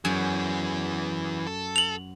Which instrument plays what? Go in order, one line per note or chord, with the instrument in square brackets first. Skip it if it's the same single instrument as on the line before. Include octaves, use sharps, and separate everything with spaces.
[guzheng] F#2 [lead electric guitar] E3 G#4
[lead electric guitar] A4
[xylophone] F7 F#7